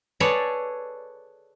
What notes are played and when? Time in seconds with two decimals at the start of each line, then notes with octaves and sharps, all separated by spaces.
0.20 G#4 A4 B4 C#5 D5